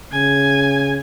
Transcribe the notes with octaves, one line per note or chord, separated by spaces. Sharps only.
C#3 G#5